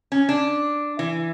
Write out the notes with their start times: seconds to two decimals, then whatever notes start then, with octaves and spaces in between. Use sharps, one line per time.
0.12 C#4
0.29 D4
0.99 E3